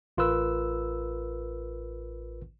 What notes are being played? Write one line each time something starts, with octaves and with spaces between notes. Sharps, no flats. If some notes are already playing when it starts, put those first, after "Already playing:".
A1 F4 A#4 B4 E6